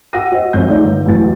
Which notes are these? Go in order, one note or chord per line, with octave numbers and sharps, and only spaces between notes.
F#4 F#5 G5 E6 A#6 D#7
F#4 C5 D#5
A#1 D#2 C4 G#4 C#5 G6
A3 D#4 C#5 D5 E5
G1
A1 E2 E3 F#3 A6